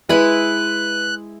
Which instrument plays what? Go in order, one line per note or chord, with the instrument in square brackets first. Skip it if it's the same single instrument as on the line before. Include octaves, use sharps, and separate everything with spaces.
[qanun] G#3 E4 B5 [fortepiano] B4 [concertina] F#6